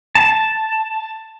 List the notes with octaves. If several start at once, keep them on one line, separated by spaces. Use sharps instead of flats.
A5